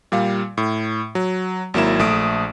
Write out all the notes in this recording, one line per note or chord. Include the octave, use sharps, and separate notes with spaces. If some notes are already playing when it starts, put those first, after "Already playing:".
A#2 G3 F5
A2
F#3
G#1 F#3 A#3 E4 E7
A#1 A3 D#6 D7